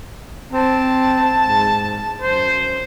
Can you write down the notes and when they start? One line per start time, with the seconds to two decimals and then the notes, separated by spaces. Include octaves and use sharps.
0.53 C4 A5
1.45 G#2
2.21 F#2 C5